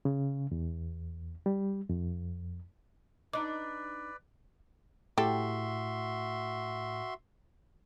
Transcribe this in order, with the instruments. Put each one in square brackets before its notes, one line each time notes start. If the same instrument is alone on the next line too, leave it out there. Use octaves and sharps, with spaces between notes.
[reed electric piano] C#3
E2
G3
F2
[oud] D4 D#4 [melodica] B4 D5 [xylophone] D6
[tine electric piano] A2 [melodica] F#4 E5 C6 [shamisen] G4 A4